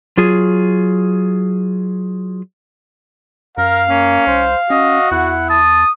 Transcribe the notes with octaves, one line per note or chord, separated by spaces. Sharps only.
F#3 F4 G#4
F#2 A#4 F5
A#3 C#4
C2 C5
C#4 F#4 D#5
E2 E4 F#5
A5 D#6